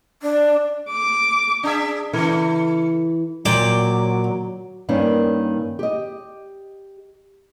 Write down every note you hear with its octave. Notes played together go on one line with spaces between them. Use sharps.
D4
D6
D4 G#4 E5
C#3 E3 A3
A#2 F#3 D5 G5 D6
G2 D#3 A#3 C#4
G4 D#5